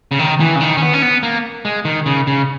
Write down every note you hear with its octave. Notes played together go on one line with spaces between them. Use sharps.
C#3
D#3
E3
C#3
D#3
C#4
B3
C#4
B3
A#3
G#3
D#3
C#3
C#3